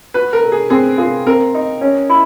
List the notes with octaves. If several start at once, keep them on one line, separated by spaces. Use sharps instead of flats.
F#4 B4
A#4
A4
G#4
C4 G#4
F4 G#4
C4 A#4
D#4
C#4
E4